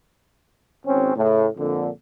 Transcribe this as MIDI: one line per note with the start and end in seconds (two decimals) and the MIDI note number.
0.85 1.15 32
0.85 1.15 60
0.85 1.15 61
1.15 1.48 45
1.15 1.48 49
1.57 1.89 41
1.57 1.89 46
1.57 1.89 50